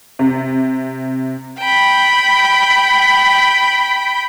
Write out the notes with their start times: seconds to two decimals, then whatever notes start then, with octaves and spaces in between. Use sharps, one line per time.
0.19 C3
1.59 G5 B5